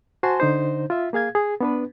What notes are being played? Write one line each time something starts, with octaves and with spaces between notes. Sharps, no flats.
F#4 C5 G#5 A5 C6
D3 D#4 C5
F4 E5
A#3 G#4 F5 G#6
G#4
B3 D4 B4